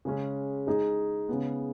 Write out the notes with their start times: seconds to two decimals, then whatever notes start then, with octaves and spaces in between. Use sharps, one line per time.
0.05 C#3 G#3 C#4
0.67 G#3 D#4 G#4
1.29 C#3 G#3 B3